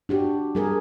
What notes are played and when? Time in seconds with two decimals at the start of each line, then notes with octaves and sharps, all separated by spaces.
0.09 D4 F#4 G4
0.55 G3 G#4 A#4